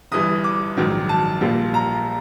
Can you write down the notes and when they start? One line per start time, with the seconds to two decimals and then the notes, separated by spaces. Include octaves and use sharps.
0.11 G1 G2 E3 G3 D#6
0.44 D6
0.77 A#1 G#2 D#3 F#3
1.09 A5
1.41 A#1 A#2 G3 A#3
1.74 A#5